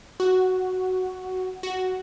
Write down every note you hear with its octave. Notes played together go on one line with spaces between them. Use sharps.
F#4
F#4